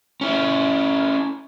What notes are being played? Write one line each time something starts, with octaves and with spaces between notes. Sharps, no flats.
C#4 E4